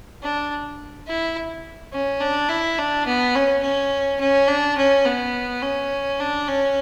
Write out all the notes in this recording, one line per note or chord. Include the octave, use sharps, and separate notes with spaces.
D4
E4
C#4
D4
E4
D4
B3
C#4
C#4
C#4
D4
C#4
B3
C#4
D4
C#4